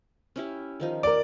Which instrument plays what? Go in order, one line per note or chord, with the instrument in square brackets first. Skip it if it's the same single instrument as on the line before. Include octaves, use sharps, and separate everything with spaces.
[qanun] C#4 E4 G4
D#3 F3 D#4
[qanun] D#4 [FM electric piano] A#4 D6 [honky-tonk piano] D5